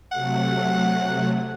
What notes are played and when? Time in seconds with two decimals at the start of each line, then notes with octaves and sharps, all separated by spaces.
0.12 C3 F#3 A3 F#5